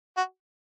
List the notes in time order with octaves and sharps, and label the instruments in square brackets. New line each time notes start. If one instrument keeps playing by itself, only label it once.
[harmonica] F#4